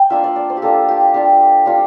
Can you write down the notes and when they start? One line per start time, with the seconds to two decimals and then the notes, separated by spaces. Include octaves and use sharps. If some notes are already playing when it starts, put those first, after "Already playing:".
Already playing: G5
0.10 A#3 D4 F4 E5
0.24 D5
0.36 D5
0.50 C5
0.57 G4
0.62 A#3 D4 F4 A4
0.88 G4
1.14 G3 D4 F4 G4
1.66 G3 D4 F4